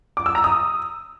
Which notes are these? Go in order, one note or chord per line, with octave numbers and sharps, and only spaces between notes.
D6
E6
A#5
D#6